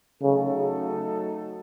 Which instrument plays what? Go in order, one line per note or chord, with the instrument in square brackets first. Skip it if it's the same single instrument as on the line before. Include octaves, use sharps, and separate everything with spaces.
[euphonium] C#3 [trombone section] F#3 A3 D#4 F#4 A4